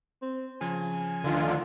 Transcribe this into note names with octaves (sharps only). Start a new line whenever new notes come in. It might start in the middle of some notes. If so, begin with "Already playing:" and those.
C4
C#3 F3 G#5
D2 D3 D#3 F4